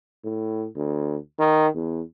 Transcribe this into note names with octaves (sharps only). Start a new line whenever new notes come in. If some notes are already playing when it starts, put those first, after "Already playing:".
A2
D2
D#3
E2